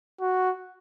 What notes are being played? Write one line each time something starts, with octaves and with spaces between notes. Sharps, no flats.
F#4